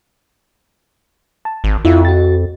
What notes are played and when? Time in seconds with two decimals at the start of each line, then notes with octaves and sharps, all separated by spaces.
1.45 A5
1.64 G#1
1.85 F2 E4 F4 E5
2.05 F#4 A6